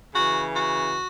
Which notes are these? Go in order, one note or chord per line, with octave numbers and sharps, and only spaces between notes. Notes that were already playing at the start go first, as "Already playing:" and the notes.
C#3 E3 F#4
F#4